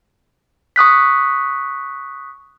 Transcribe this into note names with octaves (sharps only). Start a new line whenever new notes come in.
C#6 D#6 F#6 B6